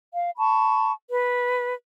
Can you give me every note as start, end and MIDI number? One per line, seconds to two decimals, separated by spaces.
0.13 0.30 77
0.37 0.92 81
0.37 0.92 83
0.37 0.92 85
1.09 1.73 71